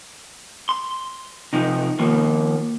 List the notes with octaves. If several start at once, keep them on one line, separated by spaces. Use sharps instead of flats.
C6
C3 F3 D#4
D#3 F3 A#3